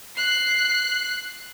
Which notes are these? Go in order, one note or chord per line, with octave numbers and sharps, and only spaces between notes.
F#6 C7